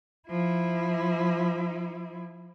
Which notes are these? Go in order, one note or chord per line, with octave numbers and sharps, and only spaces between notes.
F3 E4